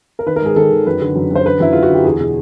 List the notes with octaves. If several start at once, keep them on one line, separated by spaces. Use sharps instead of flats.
A#4
D#3 B4
A#4
G#2 G#4
D#3 A4
D#3
F#2 B4
D3
F#2
F#2 C5
D3 B4
F#2 E4
D3 F4
F#4
D3 G4
E2 G#4
B2